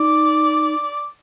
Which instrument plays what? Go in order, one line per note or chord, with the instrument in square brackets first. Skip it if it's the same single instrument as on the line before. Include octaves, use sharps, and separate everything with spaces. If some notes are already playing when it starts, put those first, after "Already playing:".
Already playing: [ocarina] D#4 [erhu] D5